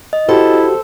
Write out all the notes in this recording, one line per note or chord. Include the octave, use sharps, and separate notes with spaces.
D#5
E4 F#4 G4 A4 C5